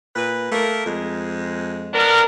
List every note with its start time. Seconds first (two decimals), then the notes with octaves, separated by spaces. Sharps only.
0.15 A#2 B4
0.52 A3 A#3 A#4
0.87 F2 G#3
1.93 B3 D4 A#4